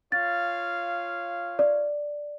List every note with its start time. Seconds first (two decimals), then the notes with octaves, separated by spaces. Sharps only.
0.12 F4 C#5 F5 A6
1.59 D5